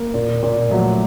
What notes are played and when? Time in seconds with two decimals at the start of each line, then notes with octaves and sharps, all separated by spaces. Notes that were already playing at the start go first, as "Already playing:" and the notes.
Already playing: A#3
0.14 A#2
0.43 A#2
0.71 F3 F#3 A3